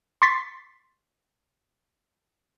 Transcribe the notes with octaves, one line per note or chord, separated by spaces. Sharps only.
C6 C#6 A6 B6 C7